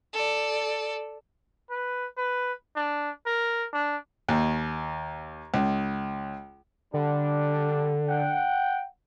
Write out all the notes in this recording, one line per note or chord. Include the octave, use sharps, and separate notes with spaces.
A4 D5
B4
B4
D4
A#4
D4
D#2
C#2
D3 G3 D4
F#5 G5